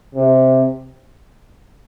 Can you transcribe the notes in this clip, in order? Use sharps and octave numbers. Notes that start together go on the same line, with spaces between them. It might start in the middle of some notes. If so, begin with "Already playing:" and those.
C3